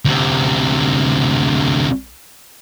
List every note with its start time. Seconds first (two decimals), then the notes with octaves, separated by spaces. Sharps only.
0.05 D2 C3